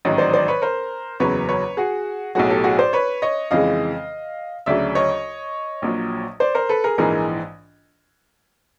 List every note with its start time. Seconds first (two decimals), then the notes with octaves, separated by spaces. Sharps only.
0.05 A1 G#2 D#3 F#3
0.18 C5 D5
0.33 C5 D5
0.48 B4 C#5
0.62 A#4 C5
1.20 F#1 E2 C#3 F#3 B4 C#5
1.49 B4 C#5
1.77 F#4 G#4
2.35 B1 A2 F#3 F#4 G#4
2.50 G4 A4
2.64 F#4 G#4
2.79 C5 D5
2.93 B4 C#5
3.22 C#5 D#5
3.51 F2 C#3 E3 G#3 D#5 F5
4.66 D2 C#3 F#3 D5 E5
4.95 C#5 D#5
5.82 A#1 A#2 F#3
6.40 C5 D5
6.55 A#4 C5
6.69 A4 B4
6.84 G#4 A#4
6.98 A#1 G#2 E3 G#4 A#4